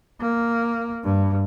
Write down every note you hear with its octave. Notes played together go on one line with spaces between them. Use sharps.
A#3
G2